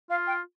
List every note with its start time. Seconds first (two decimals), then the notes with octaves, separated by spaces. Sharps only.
0.10 F4 F5
0.27 G5